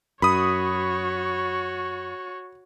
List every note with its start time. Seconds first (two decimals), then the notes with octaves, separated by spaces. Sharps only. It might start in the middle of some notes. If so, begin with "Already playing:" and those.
0.22 F#2 F#4 C#5 B5 D#6